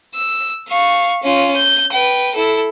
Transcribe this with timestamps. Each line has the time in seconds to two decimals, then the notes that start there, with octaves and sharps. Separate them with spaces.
0.15 E6
0.68 F5 C#6
1.23 C#4 F4
1.56 G6
1.92 B4 G5
2.35 E4 A4